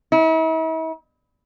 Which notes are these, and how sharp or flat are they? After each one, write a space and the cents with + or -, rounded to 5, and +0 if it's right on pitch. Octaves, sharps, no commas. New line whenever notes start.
E4 -45